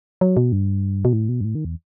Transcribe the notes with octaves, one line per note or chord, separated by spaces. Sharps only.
F#3
B2
G2
B2
A2
B2
G2
A2
D#3
E2